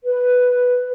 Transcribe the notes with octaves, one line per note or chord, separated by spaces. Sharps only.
B4